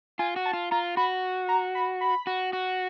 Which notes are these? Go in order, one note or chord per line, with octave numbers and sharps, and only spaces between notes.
F4 G#5
F#4
A5
F4
F4 A#5
F#4 B5
A#5
B5
B5
F#4
F#4